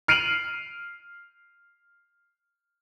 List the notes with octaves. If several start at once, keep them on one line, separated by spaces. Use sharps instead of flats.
F6 C7 D7 D#7 F7 F#7